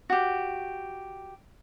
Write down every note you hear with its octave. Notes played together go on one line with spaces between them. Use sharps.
F#4 G4